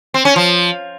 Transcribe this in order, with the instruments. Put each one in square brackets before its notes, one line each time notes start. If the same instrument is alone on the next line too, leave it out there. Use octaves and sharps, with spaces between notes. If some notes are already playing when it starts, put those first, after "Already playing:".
[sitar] C4
C#4
F3